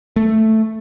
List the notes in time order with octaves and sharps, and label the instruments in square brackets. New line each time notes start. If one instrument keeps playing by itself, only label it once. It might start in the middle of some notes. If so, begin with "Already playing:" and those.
[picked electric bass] A3